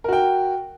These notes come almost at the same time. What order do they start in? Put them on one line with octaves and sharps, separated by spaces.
A#4 F#4 G5